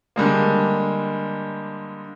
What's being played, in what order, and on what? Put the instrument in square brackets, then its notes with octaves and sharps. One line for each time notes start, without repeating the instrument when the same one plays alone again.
[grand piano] D3 G3 G#3 A#3